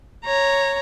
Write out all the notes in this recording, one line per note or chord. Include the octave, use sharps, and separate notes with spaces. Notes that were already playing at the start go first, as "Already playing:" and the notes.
C#5 A#5